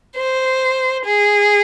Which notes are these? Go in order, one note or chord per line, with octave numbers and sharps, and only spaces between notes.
C5
G#4